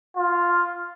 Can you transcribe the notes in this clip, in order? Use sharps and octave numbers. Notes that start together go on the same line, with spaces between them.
F4